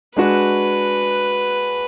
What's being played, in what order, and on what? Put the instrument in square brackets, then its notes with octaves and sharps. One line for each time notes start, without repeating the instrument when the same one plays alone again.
[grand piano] G#3 D4 F#4 [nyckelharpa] B4